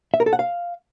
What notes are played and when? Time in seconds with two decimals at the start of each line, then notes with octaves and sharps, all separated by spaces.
0.14 E5
0.20 A#4
0.26 A4
0.33 F#5
0.39 F5